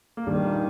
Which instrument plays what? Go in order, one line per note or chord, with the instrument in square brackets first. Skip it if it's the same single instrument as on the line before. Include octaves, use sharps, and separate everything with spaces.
[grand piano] A#3
[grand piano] G2 G3 [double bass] D#3
[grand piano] A#2 A#3